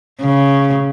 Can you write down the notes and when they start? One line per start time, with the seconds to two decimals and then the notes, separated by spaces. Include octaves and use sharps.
0.21 C#3